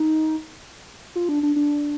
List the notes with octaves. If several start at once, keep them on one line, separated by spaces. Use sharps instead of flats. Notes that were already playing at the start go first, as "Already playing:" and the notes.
Already playing: D#4
F4
D4
D4
D4